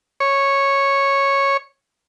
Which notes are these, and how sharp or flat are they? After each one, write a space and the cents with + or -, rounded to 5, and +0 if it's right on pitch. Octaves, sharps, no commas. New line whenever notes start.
C#5 -5